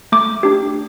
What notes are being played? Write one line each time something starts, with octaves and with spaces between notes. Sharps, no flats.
A3 D6
D4 G4